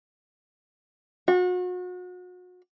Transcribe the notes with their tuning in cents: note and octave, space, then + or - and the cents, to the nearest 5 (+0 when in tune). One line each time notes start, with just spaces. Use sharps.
F#4 -35